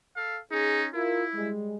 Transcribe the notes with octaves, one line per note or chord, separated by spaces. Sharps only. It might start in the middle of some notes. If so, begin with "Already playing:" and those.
A4 F5
C#4 D#4 G#4
E4 F4 A#4
G3 G#3